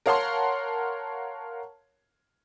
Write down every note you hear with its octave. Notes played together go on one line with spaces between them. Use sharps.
A#4 C#5 F5 F#5 A5 C6